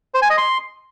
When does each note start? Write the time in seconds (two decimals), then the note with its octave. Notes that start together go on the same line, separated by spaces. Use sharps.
0.14 C5
0.22 G#5
0.30 D#5
0.38 C6